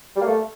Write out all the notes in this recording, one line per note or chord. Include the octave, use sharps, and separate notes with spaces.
G3
A#3
A3